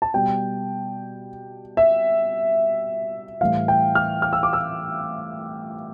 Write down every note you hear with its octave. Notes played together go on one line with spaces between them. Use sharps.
A5
B2 G3 G5
E5
A2 E3 G3 F5
G5
F6
F6
E6
D6
E6